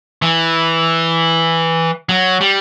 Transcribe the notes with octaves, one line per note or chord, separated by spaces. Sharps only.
E3
F#3
G3